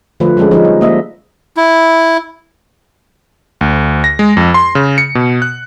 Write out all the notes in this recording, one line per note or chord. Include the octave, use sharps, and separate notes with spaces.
D3 F3 A3 F4 B4
F3 G3 G#3 C#4 A4
F3 D#4
G3
A#3 D#5 E5
E4
D2
A#6
G#3
F2
C6
C#3
C#7
B2
F#6